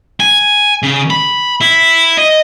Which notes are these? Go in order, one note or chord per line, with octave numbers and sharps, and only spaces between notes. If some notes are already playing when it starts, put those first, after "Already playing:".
G#5
C#3
B5
E4
D#5